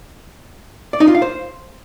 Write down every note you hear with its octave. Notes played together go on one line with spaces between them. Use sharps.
D5
D#4
F4
F5
C5